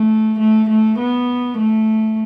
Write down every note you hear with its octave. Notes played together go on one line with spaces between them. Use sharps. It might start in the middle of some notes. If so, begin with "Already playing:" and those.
Already playing: A3
A3
A3
B3
A3